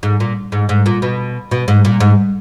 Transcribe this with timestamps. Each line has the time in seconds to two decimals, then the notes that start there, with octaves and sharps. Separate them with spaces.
0.03 G#2
0.20 A#2
0.52 G#2
0.69 G#2
0.86 A#2
1.02 B2
1.51 B2
1.68 G#2
1.85 A#2
2.00 G#2